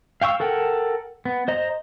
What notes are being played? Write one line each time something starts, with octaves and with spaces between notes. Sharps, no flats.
F5 G5 C#6 E6
A4 A#4 F#5 G5
B3
C5 D#5 A#5